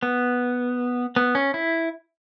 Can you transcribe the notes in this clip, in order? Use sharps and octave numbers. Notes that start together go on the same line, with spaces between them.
B3
B3
C#4
E4